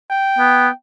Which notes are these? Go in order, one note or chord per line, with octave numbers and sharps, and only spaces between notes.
G5
B3